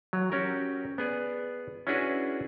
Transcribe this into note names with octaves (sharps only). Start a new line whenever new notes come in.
F#3
C#4 F#4 G4 A#4
B3 G#4 D5
C#4 D4 E4 F#4 G#4 B4